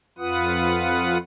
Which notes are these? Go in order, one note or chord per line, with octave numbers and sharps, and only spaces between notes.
F2 F4 B4 F#5 D#6